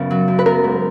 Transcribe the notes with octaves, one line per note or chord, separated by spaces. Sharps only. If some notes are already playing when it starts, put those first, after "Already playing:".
Already playing: F#2 C#3 B3
F#3
F#2
B4
B3 A#4
G#2